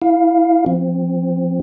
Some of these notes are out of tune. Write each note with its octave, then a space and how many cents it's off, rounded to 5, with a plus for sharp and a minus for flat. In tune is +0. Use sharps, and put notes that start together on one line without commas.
E4 +0 F5 +0
F3 -5 C4 +0